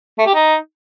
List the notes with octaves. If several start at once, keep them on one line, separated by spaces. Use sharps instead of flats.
A3
G4
D#4